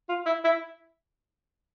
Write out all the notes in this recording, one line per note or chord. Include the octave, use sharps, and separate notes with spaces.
F4
E4
E4